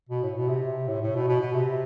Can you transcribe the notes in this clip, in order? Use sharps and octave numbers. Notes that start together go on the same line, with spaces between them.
B2
A2
B2
C3
A2
A2
B2
B2
B2
C3